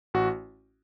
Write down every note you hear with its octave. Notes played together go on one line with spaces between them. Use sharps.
A1 F#4